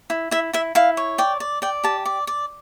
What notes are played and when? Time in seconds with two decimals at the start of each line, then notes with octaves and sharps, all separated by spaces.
0.10 E4
0.31 E4 E5
0.53 E4 E5
0.75 E4 F5
0.97 C#5
1.18 D5 G5
1.40 D5
1.62 D5 G5
1.84 G4 A5
2.05 D5
2.27 D5